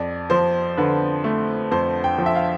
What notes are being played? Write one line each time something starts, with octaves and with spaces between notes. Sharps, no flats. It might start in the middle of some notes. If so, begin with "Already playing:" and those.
Already playing: F2 D5
F3 C5
D3 B4
A3
F2 C5
G5
F3
E5
F5